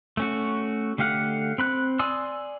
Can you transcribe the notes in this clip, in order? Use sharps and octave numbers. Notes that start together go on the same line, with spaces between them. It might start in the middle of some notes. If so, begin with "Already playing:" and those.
A3 C#4 F#4
D3 A3 G4 F5 F#5
C4 B5 F#6
D5 G#5 C6 D#6 E6